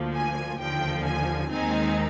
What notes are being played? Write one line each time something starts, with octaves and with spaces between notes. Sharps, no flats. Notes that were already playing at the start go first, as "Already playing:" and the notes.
Already playing: D2 D3 F3 A#3
G#5
D#2 D3 F3 G5
G#5
D#2 D#3 G#3 C4 D#4 G#5